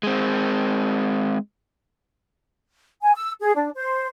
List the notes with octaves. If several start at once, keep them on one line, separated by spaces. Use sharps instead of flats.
G#3 C4
G#5
E6
G#4
D4
C5